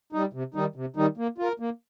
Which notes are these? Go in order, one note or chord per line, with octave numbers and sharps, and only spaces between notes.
G3 D#4
C3
D#3 G3 D#4
C3
D#3 G3 D#4
A#3
F4 A#4
A#3